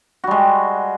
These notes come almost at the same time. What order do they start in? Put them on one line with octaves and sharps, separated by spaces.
F#4 G3 G#3